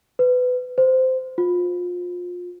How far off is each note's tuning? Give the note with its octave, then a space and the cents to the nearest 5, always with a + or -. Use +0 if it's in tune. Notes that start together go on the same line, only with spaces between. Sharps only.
B4 +20
C5 -15
F4 +30